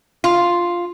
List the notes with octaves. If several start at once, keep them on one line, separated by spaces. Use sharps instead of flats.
F4